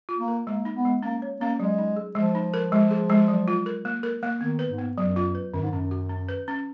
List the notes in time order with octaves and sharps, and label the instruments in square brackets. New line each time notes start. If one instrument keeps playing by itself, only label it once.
[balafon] F4
[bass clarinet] A#3
[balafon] A#4
[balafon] G#3 [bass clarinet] A#3
[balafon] D#4
[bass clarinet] B3
[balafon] G#3
[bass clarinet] A#3 [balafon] C#4
[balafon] C#5
[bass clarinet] A#3 [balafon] C#4
[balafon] F#3 [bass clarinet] G#3
[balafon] D#4
G#4
[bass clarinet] F3 [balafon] G#3
[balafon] D#4
A#4
G#3
G#4
G#3
F#3
F4
A#4
A#3
A#4
A#3
[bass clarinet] D#3 [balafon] B3
[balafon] B4
[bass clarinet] G#2
[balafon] B3
[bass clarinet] F#2 [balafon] F#3
[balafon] F4
B4
[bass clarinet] F#2 [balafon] D#3
[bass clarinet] G#2
[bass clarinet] F#2 [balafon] C#4
[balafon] F#4
C#4
B4
C#4